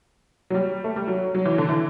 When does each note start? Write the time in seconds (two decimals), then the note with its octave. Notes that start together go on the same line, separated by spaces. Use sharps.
0.50 F#3
0.54 G3
0.84 A3
0.96 G3
1.08 F#3
1.34 F#3
1.46 E3
1.58 D3
1.69 E3